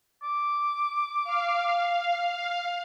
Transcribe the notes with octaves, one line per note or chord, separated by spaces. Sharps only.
D6
F5